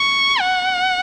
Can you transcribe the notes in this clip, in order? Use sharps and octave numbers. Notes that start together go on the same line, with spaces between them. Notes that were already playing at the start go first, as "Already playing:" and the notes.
Already playing: C#6
F#5